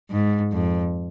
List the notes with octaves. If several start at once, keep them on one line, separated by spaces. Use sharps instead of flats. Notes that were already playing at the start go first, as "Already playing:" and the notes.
G#2
F2